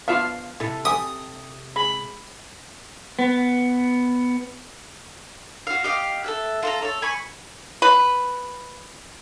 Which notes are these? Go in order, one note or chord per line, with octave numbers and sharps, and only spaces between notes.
B3 D4 F4 E5 F5
C3 E4 A4
E5 G5 G#5 D#6
G#3 B5
B3
F#4 F5
G4 D#5 F5
A4 E5 F#6
F4 A4 A#5
A4 C#5
G#5 B5 C#6
B4